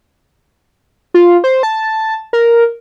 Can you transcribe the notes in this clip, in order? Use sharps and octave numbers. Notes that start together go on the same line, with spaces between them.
F4
C5
A5
A#4